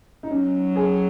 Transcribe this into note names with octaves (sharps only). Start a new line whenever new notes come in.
D#4
F#3 C#4
G#4